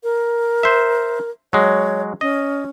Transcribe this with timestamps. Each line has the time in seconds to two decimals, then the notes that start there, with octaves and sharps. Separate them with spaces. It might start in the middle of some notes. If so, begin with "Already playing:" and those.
0.04 A#4
0.63 C5 E5
1.53 F#3 G#3 C#5
2.21 C#4 D#5